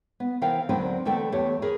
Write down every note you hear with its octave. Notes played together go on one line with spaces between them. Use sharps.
B3
C3 E3 B3 A#4 F5 G5
D2 D3 F#3 C4 A#4 B4
E2 D3 A3 B3 A4 G5
E2 A3 G4 C#5
G#4 A#4 B4